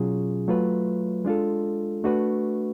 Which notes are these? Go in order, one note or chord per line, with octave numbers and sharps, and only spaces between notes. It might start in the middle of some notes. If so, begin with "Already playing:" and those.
Already playing: B2 F#3 C#4 F4 G#4
F#3 A3 F4 B4
G#3 D4 F4 A4
A3 D4 F#4 B4